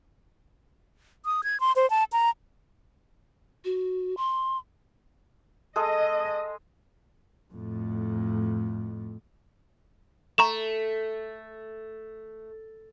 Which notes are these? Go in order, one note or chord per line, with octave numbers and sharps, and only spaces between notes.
D#6
G#6
C6
C5
A5
A#5
F#4
C6
G#3 A4 D#5 D#6
F2 A2
A3 A#5 C#6 E7